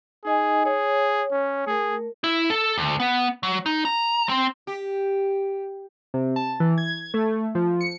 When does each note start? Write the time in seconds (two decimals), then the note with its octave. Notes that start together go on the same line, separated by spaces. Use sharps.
0.25 D#4 G#4 D#5 G#5
0.65 G#4 C#5
1.32 C#4
1.67 A3 G#4 A#4
2.24 E4
2.50 A4
2.78 D2
3.00 B3
3.43 F#3
3.66 D#4
3.85 A#5
4.29 C4
4.67 G4
6.14 C3
6.36 A5
6.60 E3
6.78 G#6
7.14 A3
7.55 F3
7.81 C#7